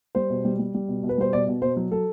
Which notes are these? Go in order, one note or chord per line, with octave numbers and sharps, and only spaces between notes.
G3 C5
B2
G3
G3
G3
B2
B2
B4
G3 C5
B2 D5
B2
B2 C5
F#3
F#3 A4